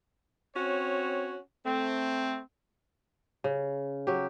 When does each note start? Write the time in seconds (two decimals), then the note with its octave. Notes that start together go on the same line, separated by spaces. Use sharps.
0.56 C4 C#4 F#4 C#5
1.66 A3 C4
3.44 C#3
4.07 F#3 G4